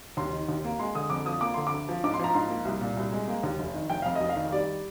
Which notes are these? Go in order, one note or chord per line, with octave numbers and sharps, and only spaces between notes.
D#2 C6
D#3
D#2
A#3
G#3 C6
D3 D#6
F2 D6
F3 D#6
A#3 D6
D3 C6
D6
D2
F3
G#2 D6
C6
F3 A#5
G#2 C6
A#3
C2
A#2
C2
G#3
A#3
D#2
F1
D#3
F1 G5
F2 F5
F1 D#5
F5
D#3
G3 D5